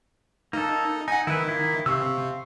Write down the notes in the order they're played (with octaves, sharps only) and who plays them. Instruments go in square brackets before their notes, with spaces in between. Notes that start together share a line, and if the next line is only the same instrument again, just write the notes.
[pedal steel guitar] A#3 A4 [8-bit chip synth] D#4
[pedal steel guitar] D#4 [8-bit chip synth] F#5 G#5
[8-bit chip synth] D#3 [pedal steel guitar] E4 B4
[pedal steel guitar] A#3 E4
[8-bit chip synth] C3 [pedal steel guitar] F5 C#6 E6